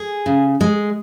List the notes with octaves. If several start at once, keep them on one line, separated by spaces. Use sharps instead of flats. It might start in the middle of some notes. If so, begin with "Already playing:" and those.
Already playing: G#4
C#3
G#3